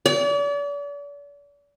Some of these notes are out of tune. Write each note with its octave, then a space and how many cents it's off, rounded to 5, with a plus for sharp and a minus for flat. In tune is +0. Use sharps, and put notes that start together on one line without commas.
D5 -40